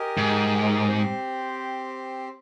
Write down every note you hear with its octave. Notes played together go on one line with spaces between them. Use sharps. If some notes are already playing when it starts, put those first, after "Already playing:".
Already playing: G4 A#4 D#5 G#5
G#2
C4 G4 C5